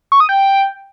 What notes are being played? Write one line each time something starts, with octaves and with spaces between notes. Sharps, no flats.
C#6
D#6
G5